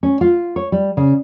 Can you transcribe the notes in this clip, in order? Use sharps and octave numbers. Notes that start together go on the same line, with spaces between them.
C#4
F4
C#5
G3
C#3